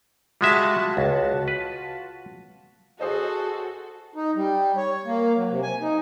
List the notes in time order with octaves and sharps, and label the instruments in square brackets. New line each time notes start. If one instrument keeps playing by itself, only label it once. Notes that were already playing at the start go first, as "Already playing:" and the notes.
[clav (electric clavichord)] G3 G#3 E5 [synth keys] F4 F#4 A5
[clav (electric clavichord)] C#2
B4
[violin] F#4 [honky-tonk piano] G#4 C5 D#5 [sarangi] A4
[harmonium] D#4
G3
C#5
A#3
F#3
C3
G#5
D#4